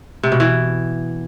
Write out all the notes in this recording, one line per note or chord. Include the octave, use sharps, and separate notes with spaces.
C3
B2
E3